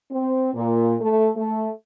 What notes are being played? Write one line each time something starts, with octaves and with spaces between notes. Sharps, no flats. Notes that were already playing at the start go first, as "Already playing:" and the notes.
C4
A#2
A3
A3